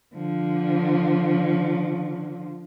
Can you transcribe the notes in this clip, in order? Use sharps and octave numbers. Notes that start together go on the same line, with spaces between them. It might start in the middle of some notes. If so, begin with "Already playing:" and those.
D3 F3